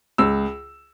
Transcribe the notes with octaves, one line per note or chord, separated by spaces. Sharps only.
C#2 E6